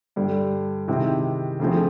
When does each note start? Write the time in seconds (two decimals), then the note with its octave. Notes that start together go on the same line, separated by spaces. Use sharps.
0.16 G2 D3 G3
0.88 C3 D#3 G#3 C4 E4
1.59 D2 C#3 F3 A3 C4